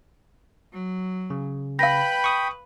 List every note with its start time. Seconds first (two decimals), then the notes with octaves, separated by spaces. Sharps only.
0.73 F#3
1.30 C#3
1.79 B4 F5 G5 B5 A#6
2.24 C#6 D#6